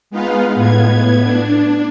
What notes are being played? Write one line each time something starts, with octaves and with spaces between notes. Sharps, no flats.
G#3 B3 D#4 F4 B4 F5
A2 B3 G#6
D4